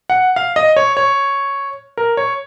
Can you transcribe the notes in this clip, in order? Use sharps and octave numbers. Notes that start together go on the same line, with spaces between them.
F#5
F5
D#5
C#5
C#5
A#4
C#5